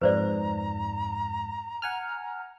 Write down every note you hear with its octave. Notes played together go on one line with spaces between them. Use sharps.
F2 G#2 B4 C5 D5 A#5
F#5 G#5 F6